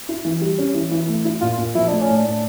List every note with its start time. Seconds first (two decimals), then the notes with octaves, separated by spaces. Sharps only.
0.09 E4
0.25 E3
0.41 G3
0.58 C#4
0.75 E3
0.92 E3
1.08 A3
1.25 E4
1.41 A#2 F4
1.58 A#2
1.75 F3 E4
1.88 A3 D4
2.01 C#4
2.08 A2
2.15 D4
2.25 A2